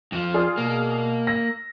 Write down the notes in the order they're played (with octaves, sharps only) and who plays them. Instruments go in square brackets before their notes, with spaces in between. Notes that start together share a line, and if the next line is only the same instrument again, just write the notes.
[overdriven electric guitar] F2 F3
[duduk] F4 [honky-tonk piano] G#4 D5 F6
[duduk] B2 [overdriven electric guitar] A#3
[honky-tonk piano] E6 A#6